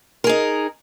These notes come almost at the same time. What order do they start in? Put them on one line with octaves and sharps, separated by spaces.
A#4 G#4 D#4